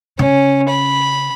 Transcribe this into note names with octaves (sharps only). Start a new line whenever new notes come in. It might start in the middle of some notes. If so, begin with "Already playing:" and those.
C#3 C#4
B5